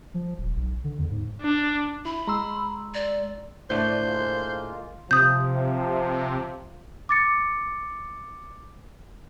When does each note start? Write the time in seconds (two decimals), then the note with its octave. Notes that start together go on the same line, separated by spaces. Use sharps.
0.14 F3
0.38 D#1
0.56 B1
0.84 D3
0.99 E2
1.11 G#2
1.42 D4
2.05 E4 B5
2.27 G#3 A#5 C6 E6
2.94 D5
3.70 A2 D3 A3 D4 C5
4.05 G#3 A#3 F4
5.11 C3 F3 D#6 G6
7.09 D6 A6 C#7